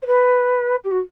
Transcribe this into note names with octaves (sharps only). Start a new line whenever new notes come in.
C5
B4
G4
F#4